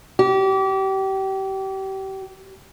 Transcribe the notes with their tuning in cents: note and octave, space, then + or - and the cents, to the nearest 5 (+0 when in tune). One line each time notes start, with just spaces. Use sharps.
G4 -30